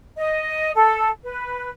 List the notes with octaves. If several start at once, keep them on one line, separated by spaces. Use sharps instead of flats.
D#5
A4
B4